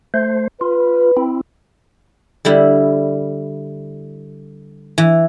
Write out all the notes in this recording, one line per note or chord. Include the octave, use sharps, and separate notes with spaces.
A3 C5
F4 B4
C4 E4
D3 G3 E4
E3